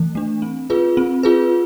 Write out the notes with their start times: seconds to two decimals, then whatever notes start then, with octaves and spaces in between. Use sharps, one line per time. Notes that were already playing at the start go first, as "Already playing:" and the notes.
Already playing: E3 A3
0.15 A3 D4
0.42 C4
0.70 F4 G#4 B4
0.97 C4
1.23 F4 G#4 B4